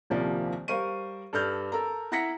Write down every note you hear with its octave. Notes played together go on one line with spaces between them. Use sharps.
D#1 C2 F3 A#3 D5
G3 A#4 C5 F5 C#6 D#7
G2 A4 D5 F6 G6
A4 A#4 A#5
E4 F#5 A#5 A#6 B6 C#7